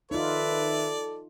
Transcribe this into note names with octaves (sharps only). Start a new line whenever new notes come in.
D#3 D#4 F4 A4 B4 D5 E5